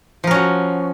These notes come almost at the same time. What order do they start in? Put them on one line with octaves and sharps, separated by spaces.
F3 A#4 C#4 F#4